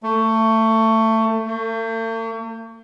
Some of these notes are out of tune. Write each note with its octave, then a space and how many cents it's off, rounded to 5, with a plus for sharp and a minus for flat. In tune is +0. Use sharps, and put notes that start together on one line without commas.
A3 +20
A3 +45